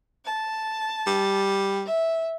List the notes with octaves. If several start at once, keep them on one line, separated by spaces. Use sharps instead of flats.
A5
G3
E5